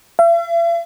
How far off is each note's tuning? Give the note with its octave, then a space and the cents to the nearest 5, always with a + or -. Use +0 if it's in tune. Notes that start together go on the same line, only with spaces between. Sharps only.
E5 +45